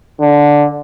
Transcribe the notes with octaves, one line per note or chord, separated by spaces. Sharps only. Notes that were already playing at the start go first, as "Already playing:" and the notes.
D3